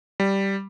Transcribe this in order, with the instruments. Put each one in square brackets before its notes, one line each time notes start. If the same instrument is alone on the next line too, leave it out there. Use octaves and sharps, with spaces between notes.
[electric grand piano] G3